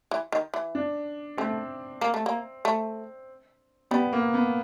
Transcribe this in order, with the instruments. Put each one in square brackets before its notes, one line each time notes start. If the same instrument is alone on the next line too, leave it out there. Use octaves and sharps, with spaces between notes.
[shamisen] E3
D#3
E3
[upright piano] D4
[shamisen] A3 [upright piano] C4
[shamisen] A#3
A3
A#3
A3
[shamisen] G3 [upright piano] B3
[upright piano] A#3
B3